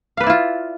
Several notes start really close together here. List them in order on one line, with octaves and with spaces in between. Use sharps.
F5 B4 D5 E4 F4